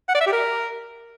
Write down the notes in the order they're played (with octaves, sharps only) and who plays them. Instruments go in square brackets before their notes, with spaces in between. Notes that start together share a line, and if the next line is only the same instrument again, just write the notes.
[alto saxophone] F#5
D5
E5
G4
A#4